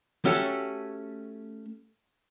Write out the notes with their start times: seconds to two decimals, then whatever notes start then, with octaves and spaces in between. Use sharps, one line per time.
0.25 A3 C#4 F#4 G4 A4